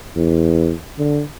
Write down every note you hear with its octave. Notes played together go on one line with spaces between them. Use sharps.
E2
D3